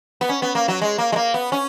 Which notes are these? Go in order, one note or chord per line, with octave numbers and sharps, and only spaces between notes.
B3
C#4
B3
A#3
F#3
G#3
A#3
G#3
A#3
B3
C#4